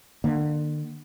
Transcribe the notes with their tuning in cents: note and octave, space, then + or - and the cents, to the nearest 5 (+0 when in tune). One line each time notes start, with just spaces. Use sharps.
D3 +35 A#3 +5